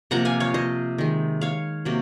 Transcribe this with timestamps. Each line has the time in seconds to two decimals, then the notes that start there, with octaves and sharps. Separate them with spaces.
0.11 C3 F3 A#3 F#5 A#5
0.25 F5 G#5
0.40 C#5 F5
0.54 C5 D#5
0.98 D#3 G#3
1.41 C#5 F5
1.85 C3 F#3 A#3